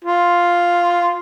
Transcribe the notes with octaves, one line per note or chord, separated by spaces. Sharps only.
F4